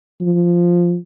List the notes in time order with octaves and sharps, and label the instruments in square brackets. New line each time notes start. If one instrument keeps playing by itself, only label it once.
[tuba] F3